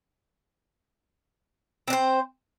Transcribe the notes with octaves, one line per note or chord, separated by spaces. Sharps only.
C4 D4 C5